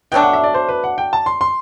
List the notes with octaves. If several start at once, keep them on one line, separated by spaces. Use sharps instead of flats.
B2 F#3 A3 D4 G5
F#5
E5
D5
C5
B4
F#5
G5
A5
C6
C6